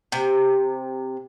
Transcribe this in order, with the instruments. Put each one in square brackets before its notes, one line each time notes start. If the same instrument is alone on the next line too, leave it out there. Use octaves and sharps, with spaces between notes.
[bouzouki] C3